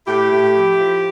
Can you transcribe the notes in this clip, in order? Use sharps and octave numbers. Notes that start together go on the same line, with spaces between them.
A2 E4 G4
A2
F3
F3